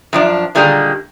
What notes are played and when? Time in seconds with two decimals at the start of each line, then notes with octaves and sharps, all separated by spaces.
0.13 F#2 F3 D4
0.55 A#2 D3 D#3 G3 G#3 A#3